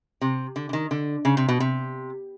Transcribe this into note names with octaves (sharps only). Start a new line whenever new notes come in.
C3
D3
D3
D#3
D3
C#3
C3
B2
C3